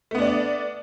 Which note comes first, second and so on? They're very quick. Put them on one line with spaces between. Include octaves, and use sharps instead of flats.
A3 B3 D4 D5